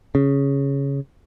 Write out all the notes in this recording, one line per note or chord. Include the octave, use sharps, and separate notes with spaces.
C#3